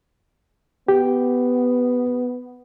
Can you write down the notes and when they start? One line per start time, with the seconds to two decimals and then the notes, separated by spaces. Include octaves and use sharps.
0.88 B3 G4